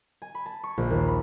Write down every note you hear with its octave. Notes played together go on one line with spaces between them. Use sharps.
G#5
B5
A5
C#6
A#1
D#2
B5